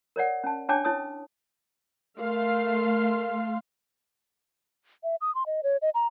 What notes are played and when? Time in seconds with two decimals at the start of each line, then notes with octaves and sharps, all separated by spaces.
0.16 A#4 C#5 D5 F#5
0.44 C#4 A5
0.69 D4 C#5 G5 A5 D6
0.84 E4 C#5 A5 D#6
2.19 A3 A#4 F5 C6
5.04 E5
5.21 D#6
5.35 C6
5.46 D#5
5.63 C#5
5.82 D#5
5.94 A#5